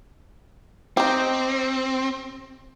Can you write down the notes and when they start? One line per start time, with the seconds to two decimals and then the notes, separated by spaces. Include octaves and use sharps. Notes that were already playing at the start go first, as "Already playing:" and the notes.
0.97 C4 D#4 G4